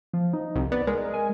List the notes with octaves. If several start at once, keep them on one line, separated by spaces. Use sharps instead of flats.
F3
D#4
C2
B3 D5
G#3 A#4
G#5